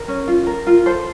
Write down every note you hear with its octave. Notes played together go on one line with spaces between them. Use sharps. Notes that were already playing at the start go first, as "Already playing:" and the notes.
Already playing: A#4
C#4
F4
A#4
F4
A4 C5